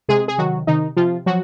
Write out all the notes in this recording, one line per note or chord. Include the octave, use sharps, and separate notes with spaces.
C3 G#3 G#4
G#4
D#3 F#3 F#4
C3 D#3 D#4
C3 F3 F4
F3 F#3 F#4